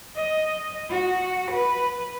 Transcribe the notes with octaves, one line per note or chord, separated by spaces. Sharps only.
D#5
F#4
B4